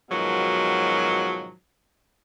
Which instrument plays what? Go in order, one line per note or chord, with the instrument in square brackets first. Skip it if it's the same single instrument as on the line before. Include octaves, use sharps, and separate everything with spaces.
[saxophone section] G#2 B2 D#3 F3 F#3